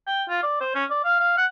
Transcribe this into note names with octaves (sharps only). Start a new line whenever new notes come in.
G5
F4
D5
C5
C#4
D5
F5
F5
F#5